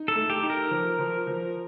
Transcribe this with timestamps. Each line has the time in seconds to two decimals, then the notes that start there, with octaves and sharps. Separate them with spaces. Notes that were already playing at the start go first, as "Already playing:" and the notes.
Already playing: D#4
0.08 A4
0.16 A3
0.30 G4
0.43 D#4
0.50 A#4
0.71 F3
0.99 F3
1.27 F3